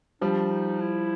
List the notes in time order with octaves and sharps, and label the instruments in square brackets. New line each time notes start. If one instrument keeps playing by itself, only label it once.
[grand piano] F3 G3 [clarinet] D4
[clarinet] D#4
E4